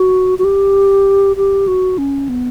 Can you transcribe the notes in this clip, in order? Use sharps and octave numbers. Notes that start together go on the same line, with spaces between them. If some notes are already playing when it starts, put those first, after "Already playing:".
Already playing: F#4
F#4
G4
G4
F#4
C#4
B3